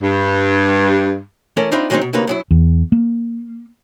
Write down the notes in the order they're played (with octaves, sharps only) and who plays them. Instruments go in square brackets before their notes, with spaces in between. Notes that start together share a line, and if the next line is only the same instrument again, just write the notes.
[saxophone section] G2
[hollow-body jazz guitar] E3 A3 C#4 A4 A#4
C4 D4 D#4 F4 E5 B5
D#3 F#3 G#3 B3 C4 D#4
B2
D2 C3 A#3 D#4 B4 C#5
F#2 F#3 E4
[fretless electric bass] E2
A#3